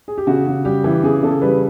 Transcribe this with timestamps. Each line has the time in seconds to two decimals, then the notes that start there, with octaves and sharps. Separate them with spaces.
0.08 G#4
0.18 G4
0.27 C#3 F#4
0.47 C#3
0.65 G3 G4
0.84 E3
1.03 C#3 G#4
1.23 C#3 A4
1.42 G3 B4